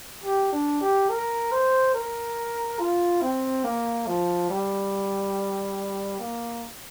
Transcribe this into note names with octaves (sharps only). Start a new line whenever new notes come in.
G4
D4
G4
A#4
C5
A#4
F4
C4
A#3
F3
G3
A#3